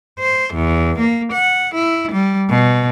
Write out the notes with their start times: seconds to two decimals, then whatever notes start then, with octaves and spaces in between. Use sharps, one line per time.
0.20 C5
0.55 E2
1.00 A#3
1.33 F#5
1.75 E4
2.12 G3
2.49 B2